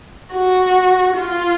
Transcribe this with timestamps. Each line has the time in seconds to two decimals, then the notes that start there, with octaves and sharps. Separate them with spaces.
0.33 F#4
1.17 F4